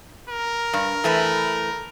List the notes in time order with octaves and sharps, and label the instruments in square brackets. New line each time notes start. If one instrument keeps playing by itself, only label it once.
[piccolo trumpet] A#4
[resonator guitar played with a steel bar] G2
E3 A3 B4